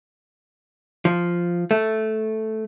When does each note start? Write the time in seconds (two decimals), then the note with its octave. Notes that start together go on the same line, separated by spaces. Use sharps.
1.05 F3
1.71 A3